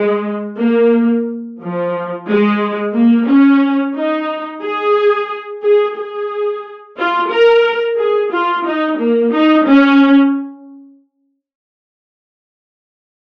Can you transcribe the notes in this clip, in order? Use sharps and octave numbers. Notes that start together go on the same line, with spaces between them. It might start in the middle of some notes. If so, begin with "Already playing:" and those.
Already playing: G#3
A#3
F3
G#3
A#3
C#4
D#4
G#4
G#4
G#4
F4
A#4
G#4
F4
D#4
A#3
D#4
C#4